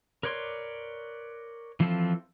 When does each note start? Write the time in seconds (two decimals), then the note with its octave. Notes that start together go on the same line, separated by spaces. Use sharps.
0.23 A#4 B4 C#5 D5 C6
1.80 E3 F3 C4 F4 A4